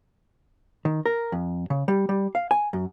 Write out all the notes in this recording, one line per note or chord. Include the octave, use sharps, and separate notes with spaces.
D#3
A#4
F2
C#3
G3
G3
F5
G#5
F#2